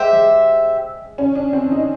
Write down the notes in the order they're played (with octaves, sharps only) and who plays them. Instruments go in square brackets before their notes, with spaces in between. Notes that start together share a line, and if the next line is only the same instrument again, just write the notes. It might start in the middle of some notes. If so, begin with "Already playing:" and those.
Already playing: [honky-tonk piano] G#3 [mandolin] G4 C5 E5
[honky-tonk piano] G#3
C#4
D4
C4
D#4